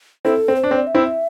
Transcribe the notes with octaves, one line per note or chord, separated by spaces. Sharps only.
C4 E4 A4
C4
C5
D4
C4
D5
E5
C4 E4